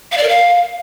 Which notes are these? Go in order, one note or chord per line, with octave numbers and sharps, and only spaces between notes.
F5
D5
A#4
F5